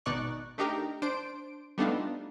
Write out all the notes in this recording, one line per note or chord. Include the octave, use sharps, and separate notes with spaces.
G#1 B2 D#4 D5 C#6 F#6
A3 D4 D#4 G4 A#4
D4 C5 D7
G3 A3 B3 D4 D#4 F4